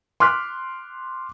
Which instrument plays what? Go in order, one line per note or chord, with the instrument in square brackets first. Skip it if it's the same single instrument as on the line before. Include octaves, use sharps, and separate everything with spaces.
[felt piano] C6 D6 F6 F#6 B6